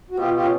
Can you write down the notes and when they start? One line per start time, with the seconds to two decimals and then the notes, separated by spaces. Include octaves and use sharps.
0.11 F#4
0.17 B2 F4 G4
0.34 F4 G4
0.43 C#4